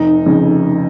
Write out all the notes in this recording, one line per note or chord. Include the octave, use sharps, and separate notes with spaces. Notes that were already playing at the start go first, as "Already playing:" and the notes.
Already playing: F1 D#4
F2 C#3